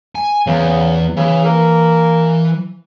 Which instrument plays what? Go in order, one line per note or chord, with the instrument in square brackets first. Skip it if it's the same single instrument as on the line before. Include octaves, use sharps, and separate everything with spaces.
[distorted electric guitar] G#5
[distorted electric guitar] E2 [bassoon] C#3
[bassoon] C#3 [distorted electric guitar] E3
[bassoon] A#3